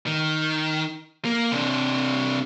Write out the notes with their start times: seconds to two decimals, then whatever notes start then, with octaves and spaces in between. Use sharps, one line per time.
0.07 D#3
1.25 A#3
1.52 C3 D4